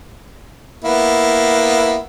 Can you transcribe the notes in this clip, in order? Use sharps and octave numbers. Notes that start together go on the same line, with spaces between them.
A#3 B3 E4